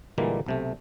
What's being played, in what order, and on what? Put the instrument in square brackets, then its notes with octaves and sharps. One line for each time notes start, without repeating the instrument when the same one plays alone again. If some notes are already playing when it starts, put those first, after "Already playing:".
[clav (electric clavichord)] A#2 D3 E3 G3 G#3 A#3
B1 C3 A3